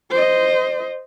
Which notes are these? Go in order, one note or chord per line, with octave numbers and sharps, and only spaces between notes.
C5 D#5